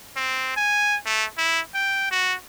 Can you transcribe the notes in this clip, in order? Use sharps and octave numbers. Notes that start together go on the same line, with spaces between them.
C4
G#5
A3
E4
G5
F#4